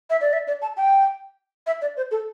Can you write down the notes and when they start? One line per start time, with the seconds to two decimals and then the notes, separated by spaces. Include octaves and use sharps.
0.10 E5
0.21 D5
0.33 E5
0.47 D5
0.62 A5
0.77 G5
1.67 E5
1.82 D5
1.97 C5
2.11 A4